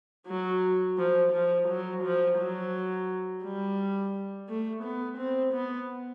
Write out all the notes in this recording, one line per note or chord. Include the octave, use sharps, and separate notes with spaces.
F#3
F3
F3
F#3
F3
F#3
G3
A3
B3
C4
B3